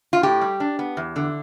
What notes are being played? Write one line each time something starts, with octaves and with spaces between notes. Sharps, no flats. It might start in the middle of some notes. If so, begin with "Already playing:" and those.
F4
A2 G4
G3
D4
B3
E2
D3